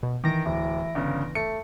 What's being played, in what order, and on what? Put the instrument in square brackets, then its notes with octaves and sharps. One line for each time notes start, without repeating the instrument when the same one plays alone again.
[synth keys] B2
[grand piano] D#3 [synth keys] E3 A#6 D7
[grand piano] D1 [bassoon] E4
[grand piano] G1 C#3
[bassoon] A3 [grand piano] C#7